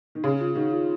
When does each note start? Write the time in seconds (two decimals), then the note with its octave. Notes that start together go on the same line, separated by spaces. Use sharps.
0.15 D#3
0.24 C#3 C#4
0.41 F4
0.55 D#3 F#4
0.71 F4